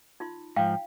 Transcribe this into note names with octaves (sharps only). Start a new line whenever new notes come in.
D#4 F4 C6
G#2 F3 F5 G5 G#5